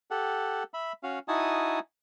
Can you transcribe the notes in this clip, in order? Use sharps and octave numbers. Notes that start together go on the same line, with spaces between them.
G4 A4 F#5
E5 B5
C#4 F#4 F5
D#4 E4 F#4 G#5 A5 D#6